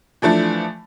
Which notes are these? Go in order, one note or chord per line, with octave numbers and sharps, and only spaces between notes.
E3 F3 A3 D4